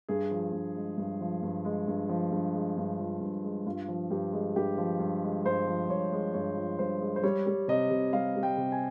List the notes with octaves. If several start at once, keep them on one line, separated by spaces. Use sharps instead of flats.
G2 G#4
F3
G2
G#3
G2
F3
G2
G#3
G2
F3
G2
G#3
G2
F3
G2
G#3
G2 F4
F3
G2 G4
G#3
G2 G4
F3
G2
G#3
G2 C5
F3
G2 C#5
G#3
G2 C#5
F3
G2 C5
G#3
C5
G3 C#5
G3
C3 D#5
C3
G3 F5
G3
G5
C3
G#5